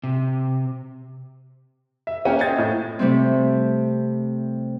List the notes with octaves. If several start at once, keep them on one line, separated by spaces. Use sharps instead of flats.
C3
E5
A#3 C#4 C#5 F#5 G5
C5 D#5 E5 G#6 A6
A2
C3 G3 A3 C4